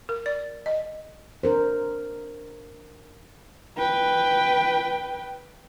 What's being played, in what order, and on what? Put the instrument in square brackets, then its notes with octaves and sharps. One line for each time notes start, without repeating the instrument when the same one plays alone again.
[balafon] A#4
D5
D#5
[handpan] D4 A#4 C5
[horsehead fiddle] B4 G5